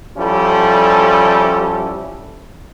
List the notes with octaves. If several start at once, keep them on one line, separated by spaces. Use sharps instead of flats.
F3 G3 C#4 E4 A4